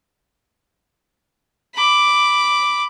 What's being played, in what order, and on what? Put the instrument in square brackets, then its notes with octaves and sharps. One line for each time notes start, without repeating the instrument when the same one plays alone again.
[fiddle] B5 D6